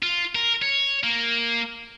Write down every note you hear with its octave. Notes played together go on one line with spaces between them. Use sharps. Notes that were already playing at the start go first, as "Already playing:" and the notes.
F4
A#4
C#5
A#3